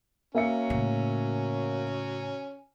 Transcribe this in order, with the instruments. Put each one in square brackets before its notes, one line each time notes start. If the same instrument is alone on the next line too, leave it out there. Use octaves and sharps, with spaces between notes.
[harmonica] F#3 C#4 [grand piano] A#3 E5 C#7
[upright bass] A2 C#3